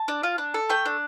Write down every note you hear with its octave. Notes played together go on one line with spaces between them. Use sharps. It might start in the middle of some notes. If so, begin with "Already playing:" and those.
Already playing: A5
D4
F4
D4
A4
A3 G5
D4